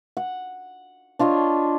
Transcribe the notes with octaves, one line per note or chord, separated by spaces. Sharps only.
F#5
D4 F4 C#5 D#5